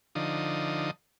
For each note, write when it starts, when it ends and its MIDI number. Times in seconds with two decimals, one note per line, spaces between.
0.15 0.91 50
0.15 0.91 53
0.15 0.91 63